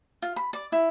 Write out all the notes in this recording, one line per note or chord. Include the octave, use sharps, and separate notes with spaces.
F4
B5
D5
E4